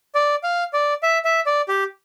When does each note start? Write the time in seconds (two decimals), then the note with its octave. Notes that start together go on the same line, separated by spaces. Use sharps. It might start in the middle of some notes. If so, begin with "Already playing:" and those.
0.15 D5
0.43 F5
0.73 D5
1.03 E5
1.25 E5
1.46 D5
1.68 G4